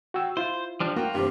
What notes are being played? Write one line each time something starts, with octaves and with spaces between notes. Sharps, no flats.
F#4 G5 E6
E4 F4 C5
F3 G3 D4
A#3 F4 F#4 G5
G2 C3 F3 G4